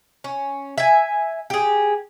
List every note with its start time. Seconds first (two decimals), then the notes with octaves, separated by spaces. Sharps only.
0.24 C#4
0.78 E5 G#5
1.50 G4 G#4